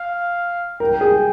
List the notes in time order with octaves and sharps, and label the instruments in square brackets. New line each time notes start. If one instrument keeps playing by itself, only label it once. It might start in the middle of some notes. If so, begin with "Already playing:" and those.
Already playing: [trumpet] F5
[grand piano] A#4 [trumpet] G5
[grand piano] G#4